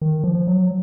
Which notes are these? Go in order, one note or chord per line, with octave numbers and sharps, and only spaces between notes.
D#3
F3
F#3